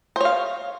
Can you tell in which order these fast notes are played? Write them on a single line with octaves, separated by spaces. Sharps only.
C5 C#5 F5